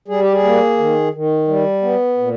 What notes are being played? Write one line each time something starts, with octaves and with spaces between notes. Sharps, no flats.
G3 G#4
G4
G#4
A#3
D#3
D#3
G3
B3
A#2